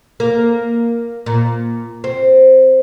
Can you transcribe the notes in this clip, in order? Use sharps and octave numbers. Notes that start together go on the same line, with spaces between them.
A#3
A#2
C4